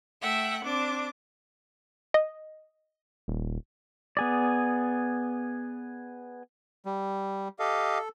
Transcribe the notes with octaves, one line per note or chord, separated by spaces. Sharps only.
A3 E5 F#5 G5
C4 D4 D6
D#5
D#1
B3 G#4 D5
G3
G4 A4 D#5 F5